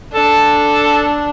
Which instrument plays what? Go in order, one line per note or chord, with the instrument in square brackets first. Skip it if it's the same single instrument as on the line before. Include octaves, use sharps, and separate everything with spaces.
[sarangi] D4 [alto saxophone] A4